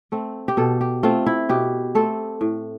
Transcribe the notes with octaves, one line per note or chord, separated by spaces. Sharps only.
A3 C4
G4
B2 A4
G4
A3 C4 F4
E4
B2 G4
A3 C4 A4
A2